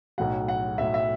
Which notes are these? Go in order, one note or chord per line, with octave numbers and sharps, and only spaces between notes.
B1 A2 F#3 F#5
F#5
B1 A2 F#3 E5
E5